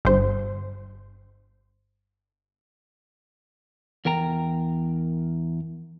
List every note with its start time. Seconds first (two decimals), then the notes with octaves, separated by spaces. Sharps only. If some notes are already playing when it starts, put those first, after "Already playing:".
0.05 G1 C5
4.05 E2 A#4 G5 A#5